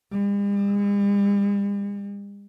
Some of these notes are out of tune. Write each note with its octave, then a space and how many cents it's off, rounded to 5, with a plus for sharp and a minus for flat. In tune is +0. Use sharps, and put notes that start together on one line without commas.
G3 +45